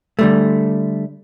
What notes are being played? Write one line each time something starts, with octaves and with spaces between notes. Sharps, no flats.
D3 G3 A3